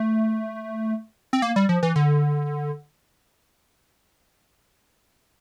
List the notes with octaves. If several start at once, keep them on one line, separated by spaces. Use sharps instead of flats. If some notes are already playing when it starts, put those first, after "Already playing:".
Already playing: A3
C4
A#3
G3
F3
E3
D3